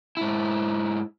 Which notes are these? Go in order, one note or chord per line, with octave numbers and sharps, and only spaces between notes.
G#2 E4